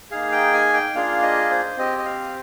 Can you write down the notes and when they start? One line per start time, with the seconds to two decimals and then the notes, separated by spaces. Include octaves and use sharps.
0.11 A#3 D#4 G#4 F5
0.32 G5
0.53 G#5
0.73 G5
0.94 A#3 D4 F4 G#4 F5
1.22 D#5
1.51 C5
1.77 C4 G4 D#5
1.99 D#5
2.05 F5